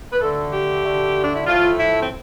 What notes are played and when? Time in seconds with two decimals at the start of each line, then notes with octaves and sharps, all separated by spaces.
0.13 B4
0.21 D2 D3 A3 A4
0.53 G4
0.84 D2 D3 A3
1.23 D4
1.36 E4
1.47 A2 F3 A3 F4
1.78 E4
2.02 C4